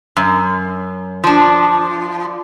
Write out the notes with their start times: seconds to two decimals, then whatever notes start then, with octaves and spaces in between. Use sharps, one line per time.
0.17 F#2
1.24 F3 D4